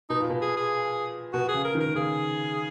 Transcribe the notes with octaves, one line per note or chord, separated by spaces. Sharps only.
B2 D#4
A#2
B2
G#4
G#4
B2 F#4
G#4
C#3
A#4
D#3
A#4
C#3 G#4